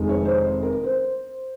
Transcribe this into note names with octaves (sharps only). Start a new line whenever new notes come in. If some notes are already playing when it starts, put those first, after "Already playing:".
Already playing: F1 F2 D#3 G#3 D#4
C#5
C5
A#4
C5